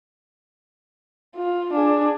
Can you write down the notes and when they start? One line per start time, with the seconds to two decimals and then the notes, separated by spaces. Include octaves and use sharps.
1.36 F4
1.73 D4 G#4